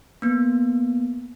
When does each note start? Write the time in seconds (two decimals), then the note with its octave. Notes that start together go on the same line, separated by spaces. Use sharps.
0.22 A#3 B3